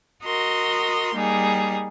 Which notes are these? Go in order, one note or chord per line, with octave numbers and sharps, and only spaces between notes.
F#4 A#4 D#5 C6
G3 A#3 D#4 G#4